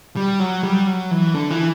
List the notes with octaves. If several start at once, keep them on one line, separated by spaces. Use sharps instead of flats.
G3
F#3
G3
F#3
E3
D3
E3